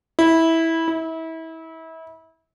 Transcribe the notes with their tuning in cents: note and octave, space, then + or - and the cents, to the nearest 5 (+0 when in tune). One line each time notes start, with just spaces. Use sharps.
E4 -15
E4 -30